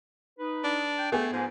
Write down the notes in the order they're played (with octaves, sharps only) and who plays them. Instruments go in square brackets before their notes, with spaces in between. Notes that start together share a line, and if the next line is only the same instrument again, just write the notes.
[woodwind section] D#4 B4
[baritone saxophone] D4
[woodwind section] G5
[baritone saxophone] A3 [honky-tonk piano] B3 G#4 B4
[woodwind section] G#2 [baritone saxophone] F3